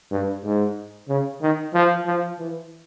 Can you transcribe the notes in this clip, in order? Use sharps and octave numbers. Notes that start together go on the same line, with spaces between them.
G2
G#2
C#3
D#3
F3
F3
E3